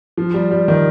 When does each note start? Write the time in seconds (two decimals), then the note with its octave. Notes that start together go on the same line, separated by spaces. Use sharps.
0.17 F3
0.34 G3
0.51 G3
0.68 D#3